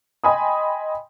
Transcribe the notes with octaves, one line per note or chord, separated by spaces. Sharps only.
D#5 G5 G#5 B5 C6 D#6